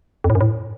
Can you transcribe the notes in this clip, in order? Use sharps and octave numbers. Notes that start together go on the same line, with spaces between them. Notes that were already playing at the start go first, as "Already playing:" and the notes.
F2
A2
F#2
A2